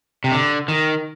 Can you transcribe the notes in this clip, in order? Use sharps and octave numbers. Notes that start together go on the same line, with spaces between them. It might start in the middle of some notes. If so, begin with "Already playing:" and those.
C3
D3
D#3